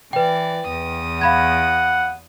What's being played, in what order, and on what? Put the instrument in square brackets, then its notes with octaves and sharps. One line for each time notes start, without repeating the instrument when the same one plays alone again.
[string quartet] E3 D5 [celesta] B4 G5
[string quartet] E2 D#6
[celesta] F5 B5 G#6 [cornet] F#5